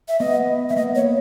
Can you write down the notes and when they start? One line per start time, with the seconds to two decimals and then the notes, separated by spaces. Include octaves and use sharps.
0.08 E5
0.20 B3 D#5
0.70 B3 E5
0.76 A#3 D#5
0.95 C#5